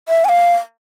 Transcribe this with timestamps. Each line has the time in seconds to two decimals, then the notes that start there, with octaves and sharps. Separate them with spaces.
0.09 E5
0.25 G#5
0.29 F5